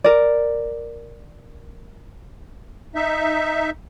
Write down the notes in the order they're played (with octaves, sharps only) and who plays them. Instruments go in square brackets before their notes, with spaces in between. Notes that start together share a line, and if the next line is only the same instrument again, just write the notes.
[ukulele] A#4 D5
[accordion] D#4 E5